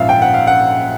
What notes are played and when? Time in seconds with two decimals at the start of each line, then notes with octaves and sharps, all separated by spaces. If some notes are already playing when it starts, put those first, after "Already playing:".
Already playing: A#1 G#2 F3 E5 F5
0.09 G5
0.22 F#5
0.34 F5
0.47 F#5